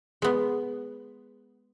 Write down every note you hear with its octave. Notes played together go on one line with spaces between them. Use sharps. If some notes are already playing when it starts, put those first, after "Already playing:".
G#3 B3